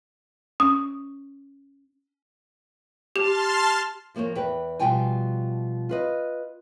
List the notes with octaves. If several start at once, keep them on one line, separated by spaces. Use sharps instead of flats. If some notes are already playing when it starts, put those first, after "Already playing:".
C#4 D#6
G4 A5 C6 F6 E7
D#2 F3 A#3 A#4 C#5
E2 B4 G5
B2 F3 G3 F4 G5 G#5
F4 B4 D#5